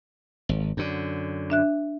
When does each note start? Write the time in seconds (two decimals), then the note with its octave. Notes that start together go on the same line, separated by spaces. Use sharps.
0.49 G#1
0.77 F#2 D3
1.50 D4 E5 F#6